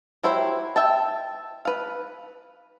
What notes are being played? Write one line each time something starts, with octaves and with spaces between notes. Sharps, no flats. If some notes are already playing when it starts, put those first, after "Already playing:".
F#3 E4 G4 C5
E5 G5 A5
B4 F5